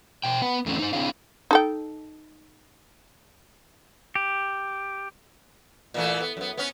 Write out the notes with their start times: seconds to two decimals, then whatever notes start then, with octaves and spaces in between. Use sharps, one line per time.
0.23 B2 G5
0.42 B3 B4 F#5
0.66 E2 A3 C4 C#4
0.79 D#4 C5
0.93 C4 D4 E4 G#4 F5
1.51 D#4 A4 G5
4.15 G4
5.94 A#2 E3 A3
6.21 B3
6.37 F#2 B3
6.57 B3 C#4